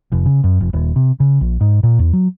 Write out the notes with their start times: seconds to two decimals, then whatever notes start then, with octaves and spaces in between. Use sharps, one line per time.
0.12 F1
0.26 C#3
0.44 F#2
0.61 F1
0.73 D#1
0.96 C3
1.20 C#3
1.41 A#1
1.61 G#2
1.83 A#2
1.99 E2
2.13 F#3